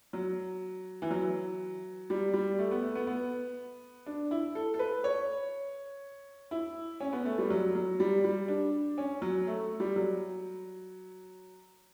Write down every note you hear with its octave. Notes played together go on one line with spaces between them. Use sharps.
F#3
E3
F#3
G3
G3
A3
B3
A3
B3
B3
D4
E4
A4
A4
B4
C#5
E4
C#4
B3
A3
G3
F#3
F#3
G3
G3
D4
C#4
F#3
A3
G3
F#3